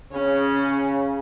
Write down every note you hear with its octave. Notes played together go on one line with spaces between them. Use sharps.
C#3 C#4